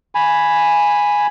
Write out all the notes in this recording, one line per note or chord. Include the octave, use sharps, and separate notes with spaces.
G#5 B5